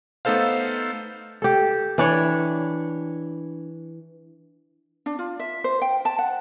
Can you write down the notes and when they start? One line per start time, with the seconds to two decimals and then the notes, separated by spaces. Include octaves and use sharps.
0.25 A3 B3 D#4 A4 C5 F5
1.42 G4 A4
1.98 E3 D4 C#5
5.06 D4
5.19 F4
5.40 E5
5.64 C5
5.82 G5
6.05 A5
6.19 F#5